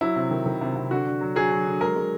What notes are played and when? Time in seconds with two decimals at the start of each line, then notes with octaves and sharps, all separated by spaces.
0.01 F#3 E4
0.16 C3
0.31 D#3
0.46 D#3
0.61 C3
0.76 C3
0.91 D3 F#4
1.06 D3
1.21 F#3
1.36 F#3 G#4
1.51 F#3
1.67 D3
1.81 G#3 A#4
1.96 G#3